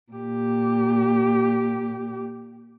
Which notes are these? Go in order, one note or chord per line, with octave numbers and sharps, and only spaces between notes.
A#2 G4